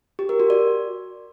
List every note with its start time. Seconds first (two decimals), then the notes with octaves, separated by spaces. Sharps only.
0.19 G4
0.29 A#4
0.40 F#4
0.50 D5